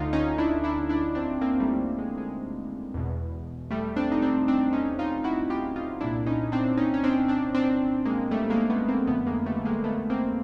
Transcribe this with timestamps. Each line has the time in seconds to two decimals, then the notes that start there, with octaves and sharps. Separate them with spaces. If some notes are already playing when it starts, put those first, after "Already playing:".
Already playing: D2 D3 D#4 F4
0.13 C#4 D#4
0.38 D4 E4
0.64 D4 E4
0.89 D4 E4
1.15 C4 D4
1.41 A#3 C4
1.60 G3 A3
1.98 G#3
2.18 G#3
2.94 E2 B2
3.71 G3 A3
3.96 C4 D4
4.12 D#4
4.22 C4 D4
4.48 C4 D4
4.73 C#4 D#4
4.99 D#4 F4
5.24 E4 F#4
5.50 F4 G4
5.76 D#4 F4
6.01 C2 A#2 D4 E4
6.26 C#4 D#4
6.52 C4 D4
6.78 C#4 D#4
6.94 C#4
7.04 C4 D4
7.28 C4 D4
7.55 C4 D4
8.05 G#3 A#3
8.31 G3 A3
8.50 G#3 A#3
8.70 A3 B3
8.88 A#3 C4
9.07 F2 D3 A3 B3
9.27 G#3 A#3
9.46 G3 A3
9.65 G#3 A#3
9.84 A3 B3
10.10 A#3 C4